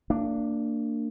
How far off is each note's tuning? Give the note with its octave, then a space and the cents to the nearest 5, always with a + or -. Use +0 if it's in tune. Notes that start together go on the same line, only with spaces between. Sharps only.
A#3 -30 D4 +0